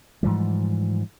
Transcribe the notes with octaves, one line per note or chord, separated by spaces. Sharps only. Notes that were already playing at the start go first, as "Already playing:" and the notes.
G#2 E3 F3 G3